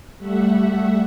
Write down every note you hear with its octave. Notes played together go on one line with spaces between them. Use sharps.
G3 A3 E5 F#5